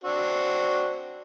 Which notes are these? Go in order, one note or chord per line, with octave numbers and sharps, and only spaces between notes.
C4 D4 F#4